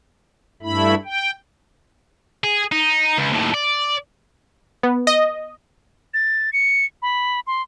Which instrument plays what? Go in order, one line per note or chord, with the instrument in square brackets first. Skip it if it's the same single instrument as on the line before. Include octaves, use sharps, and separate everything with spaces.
[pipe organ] G2 A3 E4 B5
G5
[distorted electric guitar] G#4
D#4
C#2
D#2 A2
D5
[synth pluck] B3
D#5
[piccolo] A6
C#7
B5
C6